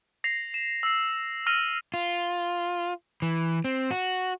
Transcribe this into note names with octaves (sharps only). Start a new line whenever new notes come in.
A#6 C7 F7
E7
E6 C7
E6 F6 A#6 D#7 F7
F4
E3
C4
F#4